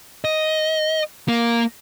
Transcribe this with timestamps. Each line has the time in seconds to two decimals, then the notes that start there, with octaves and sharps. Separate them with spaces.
0.24 D#5
1.28 A#3